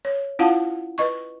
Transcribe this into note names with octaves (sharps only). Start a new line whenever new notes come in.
C#5
C#4 E4 F4 F5 F#5 A5
B4 D#5 C#6